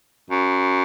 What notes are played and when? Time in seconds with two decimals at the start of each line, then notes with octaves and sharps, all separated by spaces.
0.30 F#2